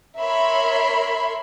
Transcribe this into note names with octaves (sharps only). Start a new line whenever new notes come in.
A#4 C#5 E5 B5 C6